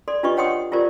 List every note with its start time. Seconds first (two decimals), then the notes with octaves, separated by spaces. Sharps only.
0.08 A4 D5 C6
0.23 D4 F4 G4 B4 D#5 C#6
0.37 C#5 F#5 G5 C6 D#6
0.72 E4 F4 G4 A#4 C5 D5